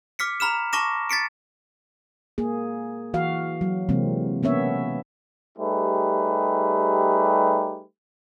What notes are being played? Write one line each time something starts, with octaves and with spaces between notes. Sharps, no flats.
D6 F6 B6 C#7
A#5 B5 F6 E7
A5 C#6 D6 A#6 E7
A6 B6 C#7 D7
A#3 G#4
E3 F#4 F5
F#3
C3 E3 G#3 A#3 C4
A#3 B3 C#4 C#5 E5
G3 A3 D#4 G4 G#4 B4